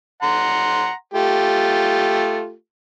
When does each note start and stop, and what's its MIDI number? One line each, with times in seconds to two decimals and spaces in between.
0.23 0.92 78
0.23 0.92 82
0.23 0.92 84
1.14 2.53 57
1.14 2.53 65
1.14 2.53 67